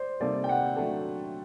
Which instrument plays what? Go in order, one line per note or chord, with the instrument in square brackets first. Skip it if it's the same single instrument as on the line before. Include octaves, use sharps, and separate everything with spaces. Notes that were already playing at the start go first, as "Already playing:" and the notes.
Already playing: [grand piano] C5 D5
[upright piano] C3 G3 A#3 D#4 A4 [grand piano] D5
[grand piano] G5
F#5
[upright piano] F#3 A3 D4 F#4 A4